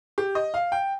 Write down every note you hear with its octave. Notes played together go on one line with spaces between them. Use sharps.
G4
D#5
F5
G5